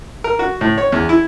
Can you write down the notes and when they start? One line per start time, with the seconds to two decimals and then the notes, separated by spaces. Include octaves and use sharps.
0.24 A#4
0.39 F#4
0.61 A2
0.78 C#5
0.92 E2
1.09 E4